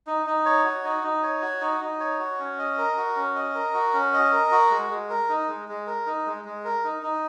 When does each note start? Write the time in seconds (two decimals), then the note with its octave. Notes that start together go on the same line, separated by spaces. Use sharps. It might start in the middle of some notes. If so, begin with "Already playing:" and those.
0.07 D#4
0.26 D#4
0.46 C#5
0.64 F#4
0.84 D#4
1.04 D#4
1.23 C#5
1.42 F#4
1.61 D#4
1.81 D#4
2.00 C#5
2.19 F#4
2.39 C#4
2.59 D#5
2.78 A#4
2.97 F#4
3.16 C#4
3.35 D#5
3.55 A#4
3.74 F#4
3.93 C#4
4.13 D#5
4.32 A#4
4.51 F#4
4.71 G#3
4.90 G#3
5.10 A#4
5.29 D#4
5.48 G#3
5.68 G#3
5.87 A#4
6.06 D#4
6.26 G#3
6.45 G#3
6.64 A#4
6.84 D#4
7.03 D#4